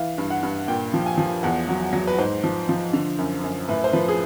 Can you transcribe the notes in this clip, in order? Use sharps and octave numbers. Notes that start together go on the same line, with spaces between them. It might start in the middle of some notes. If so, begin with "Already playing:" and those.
Already playing: E3 F5
G2
F#5
G2
A#2 G5
F3
G#5
F3
E2 F#5
F#3
F#3
B4
G#2 C5
F3
F3
D3
F#2
F#2
A2 B4
C5
F3 B4
G#4